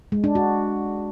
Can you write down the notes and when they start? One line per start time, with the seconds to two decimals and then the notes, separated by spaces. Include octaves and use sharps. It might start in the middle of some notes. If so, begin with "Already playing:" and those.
0.12 G#3
0.24 D4
0.35 F#4